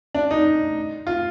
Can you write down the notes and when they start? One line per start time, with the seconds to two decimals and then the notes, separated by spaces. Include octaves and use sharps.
0.14 D4
0.31 D#4
1.07 F4